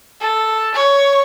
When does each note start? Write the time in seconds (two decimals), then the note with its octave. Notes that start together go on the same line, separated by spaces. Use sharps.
0.21 A4
0.75 C#5